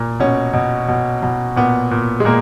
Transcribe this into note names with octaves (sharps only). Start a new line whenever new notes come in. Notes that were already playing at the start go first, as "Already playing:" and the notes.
Already playing: A#2
B2 C#4
B2
B2
B2
A#2 B3
A#2
G#3
A#2 A#3